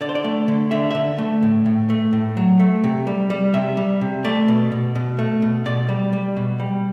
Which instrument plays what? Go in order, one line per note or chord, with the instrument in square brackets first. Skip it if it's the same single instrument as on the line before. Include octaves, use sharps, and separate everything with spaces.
[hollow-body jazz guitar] D3 D5
C5
D5
A3
D3
D3 E5
D3 E5
A3
A2
A2
A3
A2
F#3
A3
C3
G3
G3
C3 E5
G3
C3
A3 D5
B2
B2
B2
A3
B2
B2 D5
G3
G3
B2
G3